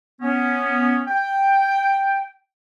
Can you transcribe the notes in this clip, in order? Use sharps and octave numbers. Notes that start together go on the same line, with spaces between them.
B3 C#4
G5